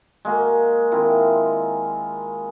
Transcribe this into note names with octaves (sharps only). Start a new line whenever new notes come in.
G#3 A#3 F#4 F5
D#3 C4 E4 F4